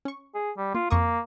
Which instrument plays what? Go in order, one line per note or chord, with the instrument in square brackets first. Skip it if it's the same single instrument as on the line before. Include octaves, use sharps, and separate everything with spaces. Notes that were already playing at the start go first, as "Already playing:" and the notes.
[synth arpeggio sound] C#4 C#6
[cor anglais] G#4
G3
[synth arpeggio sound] A#3 [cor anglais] F4
[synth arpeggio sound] F2 C#6 D#6 [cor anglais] A#3